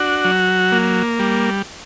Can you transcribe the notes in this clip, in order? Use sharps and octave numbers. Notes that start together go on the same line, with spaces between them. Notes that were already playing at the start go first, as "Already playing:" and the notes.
Already playing: D4 F#4
F#3
A#3
G3